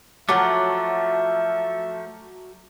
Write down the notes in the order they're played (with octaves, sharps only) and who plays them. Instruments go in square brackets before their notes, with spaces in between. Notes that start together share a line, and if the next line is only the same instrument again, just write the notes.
[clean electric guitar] F3 A3 [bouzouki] F#3 F#5 [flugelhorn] E5 [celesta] D6